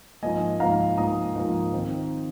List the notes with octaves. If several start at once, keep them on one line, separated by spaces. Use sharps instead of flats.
G#2 F3 A#3 D#5 G#5
G#2 F3 A#3 F5 A#5
G#2 F3 A#3 A#5 D#6
G#2 F3 A#3
D#3 C4 D#4